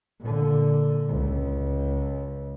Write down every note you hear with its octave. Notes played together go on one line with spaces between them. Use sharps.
A#2 D3
C#2